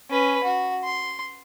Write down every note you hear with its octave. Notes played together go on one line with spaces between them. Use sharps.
C#4 B4
F#4
C6